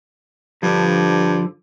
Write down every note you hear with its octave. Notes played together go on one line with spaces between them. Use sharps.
G2 D3 F3